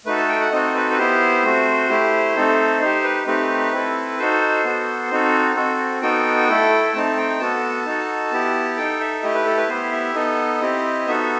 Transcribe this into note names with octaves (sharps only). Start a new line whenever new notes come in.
A3 D#4 F#4 A4 B4
A5
G5
F#5
C4 D#4 F#4 A4 D#5
B4
B4
B3 E4 G4 C5
A3 C4 F#4
A3 E4 G4
A3 C4 D#4 A4
D#4 G4 C5
B4
A3 C4 D#4 G4 B4
C4 E4 A4
D#4 F#4 A4 C5
B3 F#4 A4
C4 D#4 F#4 A4
C4 F#4 A4
B3 D#4 F#4 A4 G5
A3 E4 A4
A3 C4 D#4 A5
G5
B3 F#4 A4 A5
D#4 F#4 A4
B3 E4 G4
D#4 A4 G5
E5
A3 E4 G4 D#5
B4
A4
B4
B3 E4 G4 C5
E5
B3 D#4 A4 D#5
C4 E4 G4
B3 D#4 F#4 A4 E5